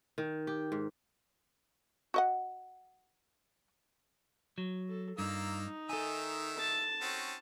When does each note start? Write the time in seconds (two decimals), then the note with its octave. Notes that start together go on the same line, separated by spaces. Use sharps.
0.18 D#3
0.47 G4
0.72 G#2
2.14 F#4 D#5 F#5
4.58 F#3
4.89 A4
5.18 G2 A#3 D#4 F4 E6
5.89 D#3 A4 E5 G#5
6.58 A5
7.01 C4 C#4 F#4